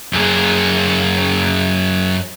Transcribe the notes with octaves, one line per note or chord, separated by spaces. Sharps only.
F#2 G#4